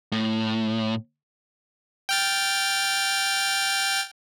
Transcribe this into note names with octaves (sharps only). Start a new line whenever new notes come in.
A2
G5 F6 A6